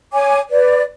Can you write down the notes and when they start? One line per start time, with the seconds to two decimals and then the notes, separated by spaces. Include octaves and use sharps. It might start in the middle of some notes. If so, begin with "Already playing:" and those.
0.13 C#5 G#5 D6
0.49 B4 D5